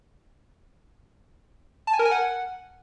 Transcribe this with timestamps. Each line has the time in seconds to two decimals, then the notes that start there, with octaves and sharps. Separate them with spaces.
1.87 A5
1.93 G#5
1.99 A#4
2.05 G#5
2.11 F#5